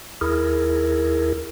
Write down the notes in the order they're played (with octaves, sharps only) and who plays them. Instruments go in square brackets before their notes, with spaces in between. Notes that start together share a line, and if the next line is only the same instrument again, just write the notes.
[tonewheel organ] D#2 E4 G#4 A#4